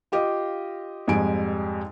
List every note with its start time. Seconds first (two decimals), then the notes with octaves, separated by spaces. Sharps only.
0.12 F4 G4 D#5 F5
1.08 F2 G#2 G3 G#5 D7